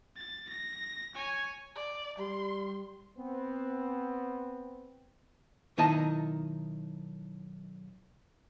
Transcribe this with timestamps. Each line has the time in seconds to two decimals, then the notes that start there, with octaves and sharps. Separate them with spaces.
0.16 A6
0.49 A#6
1.15 C#5 G#5
1.75 D5
2.18 G3 C6
3.16 B3 C4
5.78 B1 D#3 E4 D#5 A5 A#5